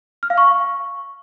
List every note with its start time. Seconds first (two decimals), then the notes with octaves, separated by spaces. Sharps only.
0.23 F6
0.30 F5
0.38 C#6